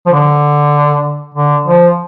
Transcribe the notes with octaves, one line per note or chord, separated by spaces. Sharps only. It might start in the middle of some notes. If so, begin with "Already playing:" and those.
F3
D3
D3
F3